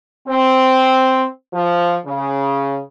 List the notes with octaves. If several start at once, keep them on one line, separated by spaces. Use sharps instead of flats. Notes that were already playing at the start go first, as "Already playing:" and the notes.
C4
F3
C#3